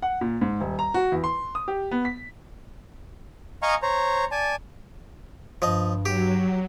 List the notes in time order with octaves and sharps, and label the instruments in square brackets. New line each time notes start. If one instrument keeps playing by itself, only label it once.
[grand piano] F#5
A#2
G#2
D#1
A#5
F#4
E2
C6
D#6
G4
B3
B6
[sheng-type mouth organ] D#5 F5 G#5 A#5 C#6 D#6
C5 C#5 A#5
D5 G#5 A5
[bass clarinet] G2 [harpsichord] F3 D#5
[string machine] F#3 [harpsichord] G4